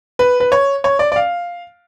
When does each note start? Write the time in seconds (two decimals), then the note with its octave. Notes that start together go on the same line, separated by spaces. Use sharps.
0.19 B4
0.40 B4
0.52 C#5
0.84 C#5
0.99 D5
1.12 D5
1.16 F5